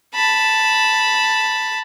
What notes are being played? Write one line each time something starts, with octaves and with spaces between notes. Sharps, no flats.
A5 B5